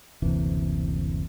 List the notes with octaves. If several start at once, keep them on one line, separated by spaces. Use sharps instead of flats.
F#1 D2 C3 E3